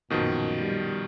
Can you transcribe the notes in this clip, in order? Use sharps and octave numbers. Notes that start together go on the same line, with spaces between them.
A#1 F#2 B2 D#3 F3
G3